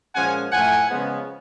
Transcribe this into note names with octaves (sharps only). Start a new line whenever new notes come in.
A#2 F3 G#3 C#4 F#5 G#5
A2 F3 A3 F#5 G#5
C#3 F3 G#3 B3